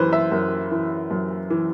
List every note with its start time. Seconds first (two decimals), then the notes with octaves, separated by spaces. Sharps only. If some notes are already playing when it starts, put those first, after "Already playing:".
Already playing: F#2 E3 B4 C5
0.13 E5
0.32 F#2
0.72 E3
1.11 F#2
1.50 E3